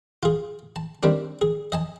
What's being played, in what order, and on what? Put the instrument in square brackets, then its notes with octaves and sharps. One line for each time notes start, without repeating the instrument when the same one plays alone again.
[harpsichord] F4 G#4
A5
D#3 G3 C4 D4
G#4
D#5 G#5 A5